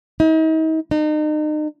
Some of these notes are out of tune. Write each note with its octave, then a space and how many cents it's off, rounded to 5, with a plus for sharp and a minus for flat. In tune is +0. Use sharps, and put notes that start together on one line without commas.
D#4 +40
D#4 -35